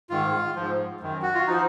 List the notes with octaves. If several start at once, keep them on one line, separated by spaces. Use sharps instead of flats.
G#2 D#3 F4
G#2 F3
F#2 D#3
F#4
F4
F3 D#4